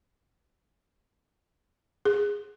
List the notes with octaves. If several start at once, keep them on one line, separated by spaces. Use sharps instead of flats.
G#4